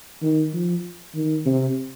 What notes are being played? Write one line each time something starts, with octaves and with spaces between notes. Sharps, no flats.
D#3
F3
D#3
C3